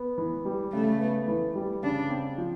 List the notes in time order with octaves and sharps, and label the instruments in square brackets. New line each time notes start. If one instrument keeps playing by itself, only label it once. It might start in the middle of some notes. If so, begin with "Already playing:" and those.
Already playing: [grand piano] B3
E3
G3
[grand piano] C#3 [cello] A3
[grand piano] B3
E3
G3
[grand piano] C#3 [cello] D4
[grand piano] C4
F3